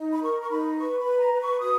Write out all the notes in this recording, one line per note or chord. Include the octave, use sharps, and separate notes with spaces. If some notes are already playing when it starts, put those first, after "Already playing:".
Already playing: D#4
B5
A#4 C#6
C#6
D#4 B5
B4 C#6
B5
B4
A#5
B4
C#6
F#4 D#6